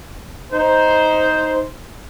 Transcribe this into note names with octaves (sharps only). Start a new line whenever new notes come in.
D#4 C5